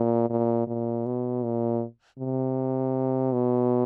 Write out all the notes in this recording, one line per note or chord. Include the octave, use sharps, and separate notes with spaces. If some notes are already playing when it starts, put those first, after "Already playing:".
Already playing: A#2
A#2
A#2
B2
A#2
C3
B2